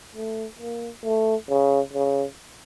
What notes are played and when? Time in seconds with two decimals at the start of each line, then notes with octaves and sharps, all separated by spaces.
0.15 A3
0.59 A#3
1.04 A3
1.49 C#3
1.93 C#3